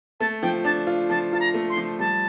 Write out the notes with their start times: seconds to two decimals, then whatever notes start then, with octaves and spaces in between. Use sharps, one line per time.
0.20 A3 A5
0.42 F3 G5
0.65 D4 A5
0.87 F4
1.09 F3 A5
1.33 F4 A5
1.40 A#5
1.54 A3
1.69 C6
1.77 F3
1.99 G3 A5